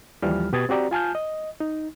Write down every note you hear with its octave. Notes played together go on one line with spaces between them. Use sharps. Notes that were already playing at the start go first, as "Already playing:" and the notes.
D#2 E3 F3 G3 F6
B2 G4 B4 D#6 G#6 A6
C4 F#4 G4 D5 A#5
F4 G#5 A5 F6 G6
D#5
D#4